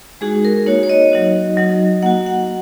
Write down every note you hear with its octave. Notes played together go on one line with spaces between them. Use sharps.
G#3 D#4 F#4 G#4
A#4
A#3 D#4 F#4 C#5
C#5
D#5
F#3 D#4 F#4
F#3 D#4 F#4
A#3 F#4 F#5
F#5